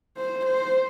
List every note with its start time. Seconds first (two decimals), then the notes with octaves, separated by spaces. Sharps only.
0.17 C5
0.46 C5